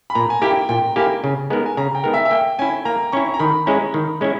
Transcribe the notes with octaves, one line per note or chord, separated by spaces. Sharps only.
B5
A#2 A#5
G#5
A#3 E4 G4 G5
A#2 G5
A#3 E4 G4 G#5
C#3 G#5
G#3 B3 D#4 A#4 A#5
G#5
C#3 A#5
G5
G#3 B3 D#4 A#4
E5
E5
A#3 G5
C#4 E4 G#5
A#3 A#5
C#4 E4 C#6
A#5
D#3 B5
G#3 C#4 E4 A#5
D#3
G#3 C#4 E4